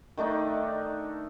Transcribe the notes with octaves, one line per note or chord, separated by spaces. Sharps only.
D#3 A3 D4 D#4